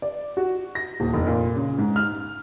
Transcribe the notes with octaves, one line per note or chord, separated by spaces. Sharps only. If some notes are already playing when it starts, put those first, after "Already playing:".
D5
F#4
A#6
D#1
F1
A#2
C#3
G#2
F6